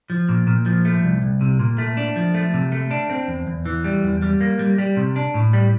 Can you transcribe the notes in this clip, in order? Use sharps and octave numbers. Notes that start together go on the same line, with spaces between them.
F3
A#2
A#2
F3
A3
C2
C2
C3
A#2
A3
D4
F3
A3
C3
A3
D4
C4
E2
E2
E3
G3
E2
G3
A#3
G3
G3
C3
D4
A2
G3